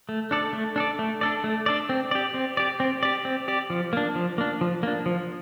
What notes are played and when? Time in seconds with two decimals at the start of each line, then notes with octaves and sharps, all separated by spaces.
0.09 A3
0.31 D4 A4 D5
0.53 A3
0.76 D4 A4 D5
0.99 A3
1.21 D4 A4 D5
1.44 A3
1.66 D4 A4 D5
1.89 C4
2.11 G4 D5
2.34 C4
2.57 G4 D5
2.80 C4
3.03 G4 D5
3.25 C4
3.48 G4 D5
3.70 F3
3.93 A#3 D4
4.15 F3
4.38 A#3 D4
4.61 F3
4.83 A#3 D4
5.06 F3